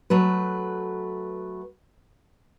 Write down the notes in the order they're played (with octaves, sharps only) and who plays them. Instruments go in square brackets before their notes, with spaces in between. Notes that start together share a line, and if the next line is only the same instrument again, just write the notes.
[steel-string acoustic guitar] F#3 A3 B4